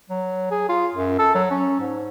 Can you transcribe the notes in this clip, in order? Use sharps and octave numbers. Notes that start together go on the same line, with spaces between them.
F#3
G#4
F4
F#2
A4
F#3
C#4
G#2